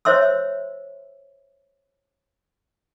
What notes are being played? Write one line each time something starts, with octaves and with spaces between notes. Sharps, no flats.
C5 C#5 E5 C6 E6